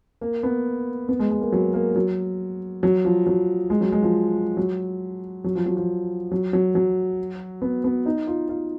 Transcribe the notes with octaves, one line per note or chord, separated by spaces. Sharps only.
A#3
B3
B3
G#3
G#3
A#3
F#3
A#3
F#3
F#3
F3
F#3
G#3
F#3
G#3
F3
F#3
F#3
F3
F#3
F3
F#3
F#3
F#3
B3
B3
D#4
F4
F4